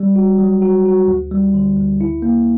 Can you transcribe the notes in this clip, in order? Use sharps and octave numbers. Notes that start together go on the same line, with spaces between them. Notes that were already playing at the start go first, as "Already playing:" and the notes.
Already playing: G3
F#4
F#3
F#4
F#4
D2
G3
D3
D2
E4
A#3